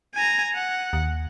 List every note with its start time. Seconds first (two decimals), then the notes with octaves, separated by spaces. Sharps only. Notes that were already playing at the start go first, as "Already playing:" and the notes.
0.15 G#5 A#5
0.54 F#5
0.93 D#2